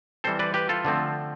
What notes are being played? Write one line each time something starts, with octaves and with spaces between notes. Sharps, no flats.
E3 G3 C4 A4 C5
B4 D5
G4 B4
F4 A4
D3 F3 A3 C4